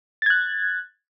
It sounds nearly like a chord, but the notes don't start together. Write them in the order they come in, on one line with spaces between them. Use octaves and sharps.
A6 G#6 F#6